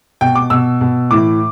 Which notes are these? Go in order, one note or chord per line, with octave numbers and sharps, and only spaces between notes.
B2 G5
D6
B2 E6
B2
A2 E3 D6